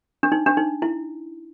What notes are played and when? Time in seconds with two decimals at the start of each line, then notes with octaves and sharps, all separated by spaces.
0.23 D4
0.32 D#4
0.46 D4
0.57 D#4
0.82 E4